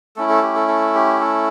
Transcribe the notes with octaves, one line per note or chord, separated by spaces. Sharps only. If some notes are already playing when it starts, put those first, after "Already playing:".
A3 C#4 E4 A4
A4
G4
A4
A4
G4
A4